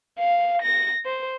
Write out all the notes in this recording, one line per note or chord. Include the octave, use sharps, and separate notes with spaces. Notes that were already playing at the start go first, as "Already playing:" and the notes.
F5
A#6
C5